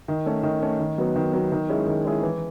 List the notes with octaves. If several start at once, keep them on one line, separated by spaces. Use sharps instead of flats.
D#3
A3 C#4
D#3
A3 C#4
D#3
F#3 B3
D#3
F#3 B3
D#3
G#3 C#4 E4 G#4
D#3
G#3 C#4 E4 G#4
E3